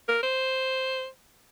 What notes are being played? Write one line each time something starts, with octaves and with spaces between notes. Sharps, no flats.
A#4
C5